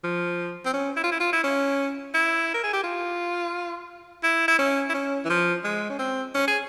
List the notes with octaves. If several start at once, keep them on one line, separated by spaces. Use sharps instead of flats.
F3
C4
C#4
E4
F4
E4
F4
E4
C#4
E4
A#4
G#4
G4
F4
E4
E4
C#4
E4
C#4
E3
F3
G#3
C#4
C4
C#4
G#4